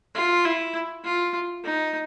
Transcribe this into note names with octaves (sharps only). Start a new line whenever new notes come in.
F4
E4
F4
D#4